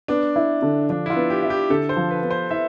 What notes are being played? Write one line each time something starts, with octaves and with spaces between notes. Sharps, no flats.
B3 D4
E4
D3
F3 D4
E4
F4
B3
G4
E4
G4
D3 A4
C5
F3
B4
B3
C5
E4 E5